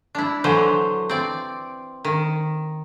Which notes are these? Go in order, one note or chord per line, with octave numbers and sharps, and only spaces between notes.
D4 E4
D3 E3 F#3 C5
C4 D5
D#3